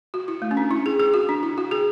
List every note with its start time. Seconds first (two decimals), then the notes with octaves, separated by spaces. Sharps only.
0.14 F#4
0.28 E4
0.42 A3
0.51 C#4
0.57 D4
0.71 E4
0.86 G#4
1.00 G#4
1.14 F#4
1.29 D4
1.43 E4
1.58 F#4
1.71 G#4